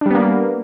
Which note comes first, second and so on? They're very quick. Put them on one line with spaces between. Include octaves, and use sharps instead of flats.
D4 G3 B3 A#3